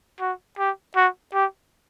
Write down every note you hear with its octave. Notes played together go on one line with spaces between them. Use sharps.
F#4
G4
F#4
G4